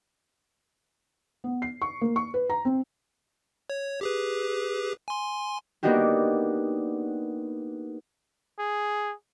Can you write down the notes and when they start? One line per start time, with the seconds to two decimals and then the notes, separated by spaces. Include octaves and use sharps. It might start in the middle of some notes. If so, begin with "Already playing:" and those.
1.44 B3
1.62 C7
1.82 C#6
2.01 A#3
2.16 C#6
2.34 B4
2.50 A#5
2.65 C4
3.70 C#5
4.01 G4 G#4 B4
5.08 G#5 C6
5.83 A#3 B3 D4 D#4 F#4 G4
8.59 G#4